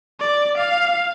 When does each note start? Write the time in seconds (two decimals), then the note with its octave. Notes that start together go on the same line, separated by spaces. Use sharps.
0.20 D5
0.57 F5